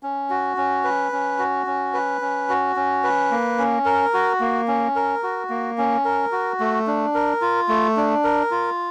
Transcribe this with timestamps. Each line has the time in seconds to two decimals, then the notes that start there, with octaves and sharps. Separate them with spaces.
0.03 C#4
0.30 F#4
0.57 C#4
0.84 B4
1.12 C#4
1.39 F#4
1.66 C#4
1.94 B4
2.21 C#4
2.49 F#4
2.76 C#4
3.04 B4
3.31 A#3
3.58 C#4
3.85 A#4
4.14 F#4
4.40 A#3
4.68 C#4
4.96 A#4
5.23 F#4
5.50 A#3
5.78 C#4
6.05 A#4
6.32 F#4
6.60 A3
6.87 D4
7.15 A#4
7.41 F4
7.69 A3
7.97 D4
8.24 A#4
8.51 F4